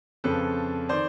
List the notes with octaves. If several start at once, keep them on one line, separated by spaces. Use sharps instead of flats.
F2 C#3 F3 A4 B4
D#3 C5 D5